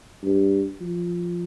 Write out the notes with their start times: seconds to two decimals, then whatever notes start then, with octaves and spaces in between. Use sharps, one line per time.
0.23 G2
0.81 F3